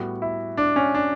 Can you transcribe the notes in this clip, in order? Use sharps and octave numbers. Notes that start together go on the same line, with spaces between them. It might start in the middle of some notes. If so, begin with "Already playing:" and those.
Already playing: A2 G3 B3 F#4
E4
D4
C#4
D4